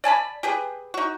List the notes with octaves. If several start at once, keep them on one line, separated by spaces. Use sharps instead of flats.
D5 G#5 A5 B5
G4 G#4 B4
D#4 F#4